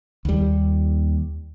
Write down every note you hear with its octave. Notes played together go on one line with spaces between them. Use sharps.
D#2 G3